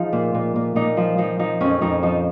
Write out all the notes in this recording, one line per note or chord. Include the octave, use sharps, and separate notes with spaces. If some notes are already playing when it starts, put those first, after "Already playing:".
Already playing: F3 D#4 F4 G#4
A#2
A#2
A#2
A#2 D#4
F3
F3 D#4
F3 D#4
F2 C#4
F2 D#4
F3 D#4